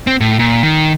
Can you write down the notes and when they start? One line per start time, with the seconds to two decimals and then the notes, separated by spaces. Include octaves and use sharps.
0.07 C4
0.21 A2
0.39 A#2
0.63 D#3